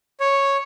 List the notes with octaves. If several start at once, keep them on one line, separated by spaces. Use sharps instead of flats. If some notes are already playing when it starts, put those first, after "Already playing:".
C#5